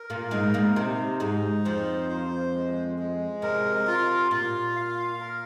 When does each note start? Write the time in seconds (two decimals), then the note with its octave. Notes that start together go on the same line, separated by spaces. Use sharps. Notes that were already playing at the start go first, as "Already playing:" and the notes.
Already playing: A#4
0.10 A#2 A#3
0.31 G#2 G#3 D#4
0.54 A#2 A#3
0.76 C3 C4 D#4
1.20 G#2 G#3 D#4
1.65 F2 F3 C5
2.10 C5
2.54 G#3
2.98 G#3
3.42 C3 A#4
3.87 F4
4.31 A#2 F4
4.76 F5
5.20 A#4